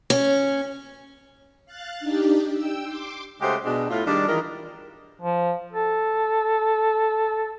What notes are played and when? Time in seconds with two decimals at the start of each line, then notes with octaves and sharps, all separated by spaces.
0.10 C#4
1.66 F5 F#6 A6
2.00 D4 D#4 G4
2.52 G5 E6
2.84 C6 D6
3.41 C#3 G#3 A3 F#4 G4 C5
3.64 B2 G#3 D4
3.90 A2 F4
4.05 D#3 G3 G#3 D4
4.27 D#3 E3 G#3 D#4 F4 A#4
5.21 F3
5.73 A4